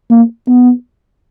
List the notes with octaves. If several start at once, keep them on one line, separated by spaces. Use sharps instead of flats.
A#3
B3